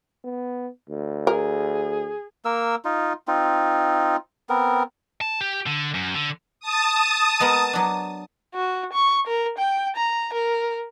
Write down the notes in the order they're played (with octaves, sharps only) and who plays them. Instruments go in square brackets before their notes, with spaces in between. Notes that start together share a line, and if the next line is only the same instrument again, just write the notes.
[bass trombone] B3
D2
[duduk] G#4 [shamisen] A#4
[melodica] A#3 A#4 E6
D#4 F4
C4 D#4 F4
B3 C4 A#4
[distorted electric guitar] A5
G4
D3
F#2
D3
[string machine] A5 D#6
[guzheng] G#3 B3 A#4
F#3 D4
[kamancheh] F#4
C#6
A#4
G5
A#5
A#4